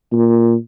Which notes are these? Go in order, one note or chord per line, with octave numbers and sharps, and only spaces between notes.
A#2